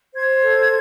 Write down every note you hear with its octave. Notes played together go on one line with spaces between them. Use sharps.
C5 G#6
A4